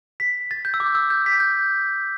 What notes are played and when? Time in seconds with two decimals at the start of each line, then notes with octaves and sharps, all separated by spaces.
0.20 B6
0.51 A6
0.65 G6
0.74 E6
0.80 D6
0.95 E6
1.10 G6
1.26 B6
1.40 G6